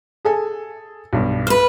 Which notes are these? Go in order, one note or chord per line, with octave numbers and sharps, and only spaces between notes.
G#4 A4 G#5
B1 G2
B4 C5 F6